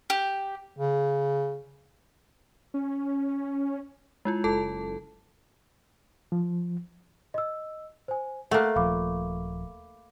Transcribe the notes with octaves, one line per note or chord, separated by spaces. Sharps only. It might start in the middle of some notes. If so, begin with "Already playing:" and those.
G4
C#3
C#4
G#3 E4 F4
F#1 A4 A5
F3
D#5 E6
C5 G#5
A3 A#3 F#5 F#6
D#1 F3 F5 B5 D6